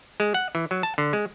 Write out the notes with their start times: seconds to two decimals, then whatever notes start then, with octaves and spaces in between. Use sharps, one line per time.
0.20 G#3
0.34 F#5
0.55 E3
0.71 F#3
0.83 A5
0.98 D3
1.13 G#3